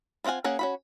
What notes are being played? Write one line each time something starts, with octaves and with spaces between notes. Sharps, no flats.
B3 C4 F4 F#5 G#5
A#3 C#4 G#4 F#5
C#4 F#4 B5